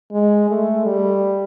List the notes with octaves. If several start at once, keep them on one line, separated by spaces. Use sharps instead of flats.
G#3
A3
G3